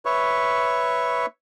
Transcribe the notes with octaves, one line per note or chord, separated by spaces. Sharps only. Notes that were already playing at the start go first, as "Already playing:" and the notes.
B4 C#5 E5 C#6